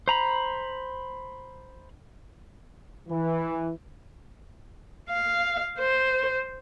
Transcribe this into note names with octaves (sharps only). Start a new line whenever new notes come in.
C5 A#5 B5
E3
F5
C5